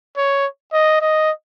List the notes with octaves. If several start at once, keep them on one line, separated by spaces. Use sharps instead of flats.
C#5
D#5
D#5